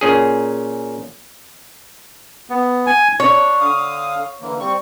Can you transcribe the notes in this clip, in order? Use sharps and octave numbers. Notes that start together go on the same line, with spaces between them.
A#2 C#4 G#4
B3
G#5
D4 C#5
D3 F5 D#6
D3 E3 A#3
G3 C4 C#6